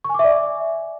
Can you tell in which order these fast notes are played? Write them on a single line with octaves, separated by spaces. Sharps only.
C#6 G#5 D6 E5 D5